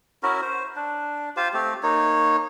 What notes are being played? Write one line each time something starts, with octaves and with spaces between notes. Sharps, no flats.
C#4 E4 F#4 A#4
C5
D4
F4 G4 C5 F5
A3 C4 G4
A#3 D#4 C#5